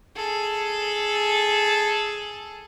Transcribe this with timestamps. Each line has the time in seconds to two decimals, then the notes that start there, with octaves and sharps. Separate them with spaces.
0.16 G#4 A4